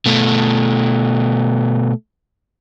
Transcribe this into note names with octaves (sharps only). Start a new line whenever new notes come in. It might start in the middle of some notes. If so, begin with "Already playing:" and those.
B2 A3